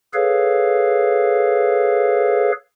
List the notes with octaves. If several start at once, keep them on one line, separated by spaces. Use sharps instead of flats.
G#4 A4 B4 C#5 F5